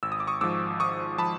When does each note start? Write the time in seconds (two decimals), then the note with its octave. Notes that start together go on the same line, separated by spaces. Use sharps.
0.03 G#1 E6
0.12 D#6
0.20 D6
0.27 C#6 D#6
0.41 G#2 F3 D6 E6
0.80 G#1 C#6 D#6
1.18 F3 A5 B5